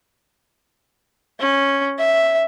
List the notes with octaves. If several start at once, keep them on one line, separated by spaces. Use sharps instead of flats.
C#4
E5